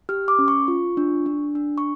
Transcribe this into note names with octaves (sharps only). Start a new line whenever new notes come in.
G4 F6
D6
C#4
C#6
F4
D4
D4
D4
C#6